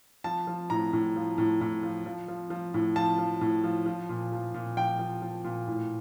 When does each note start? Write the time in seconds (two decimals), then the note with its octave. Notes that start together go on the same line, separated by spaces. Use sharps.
0.24 F3 A5
0.47 F3
0.70 A2 A#5
0.93 A2
1.16 F3
1.38 A2
1.61 A2
1.83 F3
2.06 F3
2.28 F3
2.50 F3
2.74 A2
2.96 F3 A5
3.18 F3
3.41 A2
3.64 F3
3.86 F3
4.09 A#2
4.32 F3
4.54 A#2
4.77 F3 G5
4.99 F3
5.22 F3
5.44 A#2
5.68 A2